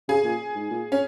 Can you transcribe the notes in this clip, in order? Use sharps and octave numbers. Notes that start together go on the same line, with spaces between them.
C#3 G#4
A#2
G#2
A#2
C#4